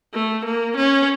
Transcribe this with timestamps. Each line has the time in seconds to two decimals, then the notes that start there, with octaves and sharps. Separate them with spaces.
0.13 A3
0.45 A#3
0.76 C#4